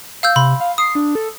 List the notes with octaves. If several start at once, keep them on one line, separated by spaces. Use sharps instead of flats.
F5 E6 G6
C3 B5 C6
F5
D#6 C7
D4
A4